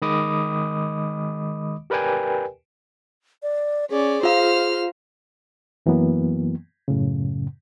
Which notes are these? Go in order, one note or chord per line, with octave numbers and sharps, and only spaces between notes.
D#3 G#3 D#5 B5 D6 D#6
G4 A#4 B4 D5 G5 G#5
D5
C#4 G#4 D5
F4 C5 F5 F6
F#2 E3 F#3 A#3 B3
F#2 A2 C#3